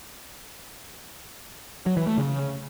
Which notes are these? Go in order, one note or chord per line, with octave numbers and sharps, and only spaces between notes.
F#3
E3
A3
C#3